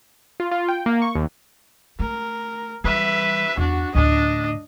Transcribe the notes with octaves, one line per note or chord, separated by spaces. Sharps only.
F4
F4
G5
A#3
C#6
D#2
A3 A#4
E3 G3 B4 E5
E2 D4 F#4
D2 A2 D4 D#5